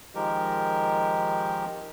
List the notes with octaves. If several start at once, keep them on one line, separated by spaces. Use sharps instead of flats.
D#3 F3 G#3 G4 A#4